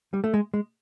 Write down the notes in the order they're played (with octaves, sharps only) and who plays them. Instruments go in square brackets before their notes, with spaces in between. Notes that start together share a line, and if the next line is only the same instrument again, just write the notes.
[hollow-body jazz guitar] G3
A3
G#3
G#3